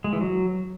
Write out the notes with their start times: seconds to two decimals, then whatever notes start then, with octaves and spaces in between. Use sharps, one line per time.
0.04 G#3
0.13 E3
0.21 F#3